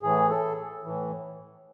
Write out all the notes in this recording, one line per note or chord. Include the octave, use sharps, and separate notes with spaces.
A2 E3 G#4
A4
A2 E3